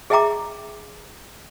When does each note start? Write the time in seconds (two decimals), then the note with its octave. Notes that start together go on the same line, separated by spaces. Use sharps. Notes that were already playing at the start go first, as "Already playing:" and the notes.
0.10 G#4 D#5 E5 G5 A#5 D6